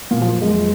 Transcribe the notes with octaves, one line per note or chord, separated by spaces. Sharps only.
F2 A#2 D#3 F#3 B3
F3
G#3